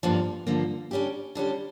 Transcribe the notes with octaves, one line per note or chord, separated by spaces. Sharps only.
G2 D3 F3 A#3
G2 D3 F3 A#3
D3 G3 C#4 G4
D3 G3 C#4 G4